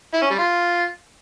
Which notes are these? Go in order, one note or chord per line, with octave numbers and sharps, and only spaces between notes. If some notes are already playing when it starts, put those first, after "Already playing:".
E4
C#4
G3
F4